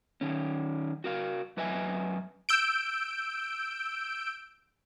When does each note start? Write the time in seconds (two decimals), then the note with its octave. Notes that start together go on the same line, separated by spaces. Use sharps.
0.21 D#3 C#4
1.04 F#4 A#4 F5
1.57 F#2 B4 D#5 E5 G#5
2.49 E6 G6 D7